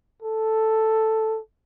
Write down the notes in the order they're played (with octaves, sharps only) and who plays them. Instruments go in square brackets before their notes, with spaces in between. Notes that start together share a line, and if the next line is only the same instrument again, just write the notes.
[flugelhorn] A4